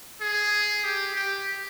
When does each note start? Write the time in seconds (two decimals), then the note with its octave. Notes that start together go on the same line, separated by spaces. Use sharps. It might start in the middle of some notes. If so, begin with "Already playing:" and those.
0.21 G#4
0.84 G4
1.15 G4